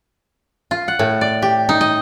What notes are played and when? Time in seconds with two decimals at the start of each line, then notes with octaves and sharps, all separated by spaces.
0.71 F4
0.88 F#5
0.99 A2
1.21 D5
1.42 G4
1.69 D#4
1.81 D#5